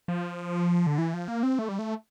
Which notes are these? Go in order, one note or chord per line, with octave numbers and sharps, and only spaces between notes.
F3
D3
E3
F3
A#3
C4
A3
G3
A3